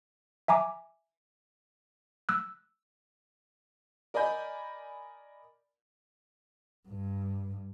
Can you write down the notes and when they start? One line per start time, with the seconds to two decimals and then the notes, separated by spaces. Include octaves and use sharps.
0.48 E5 G#5 A#5 D6
2.29 E6 F#6
4.14 A#4 D5 D#5 G#5 B5 G6
6.88 G2